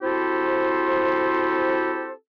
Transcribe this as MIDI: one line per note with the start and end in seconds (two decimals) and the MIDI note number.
0.02 2.11 60
0.02 2.11 64
0.02 2.11 66
0.02 2.11 67
0.02 2.11 69
0.02 2.11 72